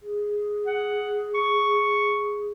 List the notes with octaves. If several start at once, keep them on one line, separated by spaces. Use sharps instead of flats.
G#4
F#5
C#6